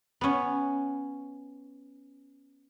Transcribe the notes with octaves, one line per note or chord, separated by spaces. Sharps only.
B3 C#4